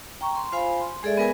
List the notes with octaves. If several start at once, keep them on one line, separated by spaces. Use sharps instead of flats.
G5 A#5 C#6
C6
F4 C5 F5 G#5 B5
C6
G#3 G#4 A4 D5 E5
B3 G#4 A#4 B4 G#5